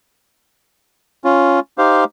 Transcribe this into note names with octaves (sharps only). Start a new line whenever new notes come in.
C#4 F4
D#4 G4 C5 F5